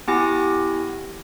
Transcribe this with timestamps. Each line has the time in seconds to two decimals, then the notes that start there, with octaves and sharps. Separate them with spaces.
0.08 B3 E4 G4 G#5 A#6